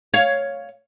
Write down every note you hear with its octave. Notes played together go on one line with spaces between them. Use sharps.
C#5 F5